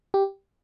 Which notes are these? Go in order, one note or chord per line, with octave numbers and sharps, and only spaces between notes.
G4